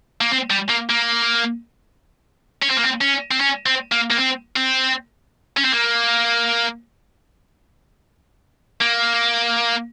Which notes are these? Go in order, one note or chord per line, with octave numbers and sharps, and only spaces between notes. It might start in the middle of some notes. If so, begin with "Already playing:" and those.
A#3
C4
G3
A#3
A#3
C#4
C4
A#3
C4
C#4
C4
C#4
C4
A#3
A#3
C4
C4
C#4
C4
A#3
A#3